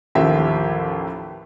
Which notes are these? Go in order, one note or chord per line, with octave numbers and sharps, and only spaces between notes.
A1 D#2 F3 G4 E5